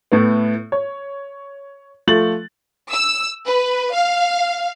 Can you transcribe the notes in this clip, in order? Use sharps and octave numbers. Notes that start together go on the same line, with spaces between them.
A2 A3 B3
C#5
F3 A3 A6 F#7
E6
B4
F5